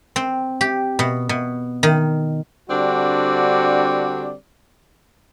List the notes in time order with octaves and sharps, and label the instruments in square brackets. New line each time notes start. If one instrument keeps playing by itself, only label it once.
[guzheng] C4
G4
B2
B2
D#3
[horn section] D3 G3 C4 D4 F#4 D5